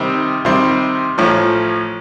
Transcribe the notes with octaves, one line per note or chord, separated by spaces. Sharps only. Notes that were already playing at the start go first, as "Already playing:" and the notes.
Already playing: C3 D#3 G3 C4
C3 D#3 G3 C4 C6
A1 A2 F3